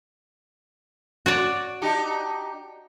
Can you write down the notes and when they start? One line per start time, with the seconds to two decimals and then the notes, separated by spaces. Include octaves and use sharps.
1.26 F#4 C#5 D5
1.82 D4 D#4 G4